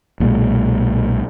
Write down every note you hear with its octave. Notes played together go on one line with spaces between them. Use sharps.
B1 A#2 G3 G#3